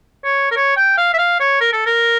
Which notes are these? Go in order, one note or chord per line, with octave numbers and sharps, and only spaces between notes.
C#5
A#4
C#5
G5
F5
E5
F5
C#5
A#4
A4
A#4